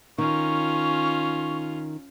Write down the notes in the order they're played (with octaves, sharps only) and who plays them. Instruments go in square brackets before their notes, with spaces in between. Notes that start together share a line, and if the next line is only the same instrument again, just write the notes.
[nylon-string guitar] D#3 [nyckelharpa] C#4 F4 [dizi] C#6